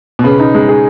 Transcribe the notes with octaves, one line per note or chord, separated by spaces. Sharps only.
B2
C#3 B4
D#4
G#3
G#4